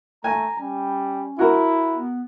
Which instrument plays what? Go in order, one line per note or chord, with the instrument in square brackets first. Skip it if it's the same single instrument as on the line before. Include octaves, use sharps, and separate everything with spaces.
[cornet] A3 [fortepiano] G#5 [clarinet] A#5
[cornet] G3 [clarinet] C#4
[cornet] E4 [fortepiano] F#4 A#4
[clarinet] B3